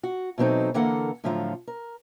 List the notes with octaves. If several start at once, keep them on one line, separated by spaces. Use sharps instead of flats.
F#4
B2 E3 F#3 C4 D#4 A4
D3 E3 A#3 A4 A#4 F#5
A2 D3 F3 F#3 F4
A#4